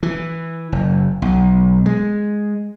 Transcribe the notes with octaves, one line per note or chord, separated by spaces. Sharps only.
E3
F#1
B1
G#3